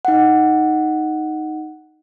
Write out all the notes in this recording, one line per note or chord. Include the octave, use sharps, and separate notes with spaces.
D#4 F#5